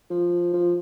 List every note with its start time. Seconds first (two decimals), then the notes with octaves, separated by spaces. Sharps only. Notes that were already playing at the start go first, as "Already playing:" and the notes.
0.10 F3
0.53 F3